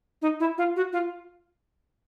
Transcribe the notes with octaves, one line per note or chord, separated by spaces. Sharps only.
D#4
E4
F4
F#4
F4